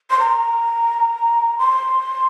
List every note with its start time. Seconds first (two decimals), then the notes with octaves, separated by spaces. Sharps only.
0.10 C6
0.19 A#5
1.58 C6